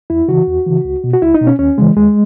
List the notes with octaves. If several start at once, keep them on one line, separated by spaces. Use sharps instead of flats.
E2 E4
C#3 E3 F#4
E2
C#3 E3
C#2
B2
F#4
C#2 E4
D#4
B2
C#4
D#2 C#4
C#3 E3 G#3
D#2 G#3